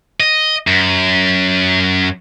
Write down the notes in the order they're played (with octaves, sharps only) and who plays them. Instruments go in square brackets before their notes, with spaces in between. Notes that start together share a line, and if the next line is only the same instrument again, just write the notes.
[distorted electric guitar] D#5
F#2